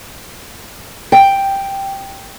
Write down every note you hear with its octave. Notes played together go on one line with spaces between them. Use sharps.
G5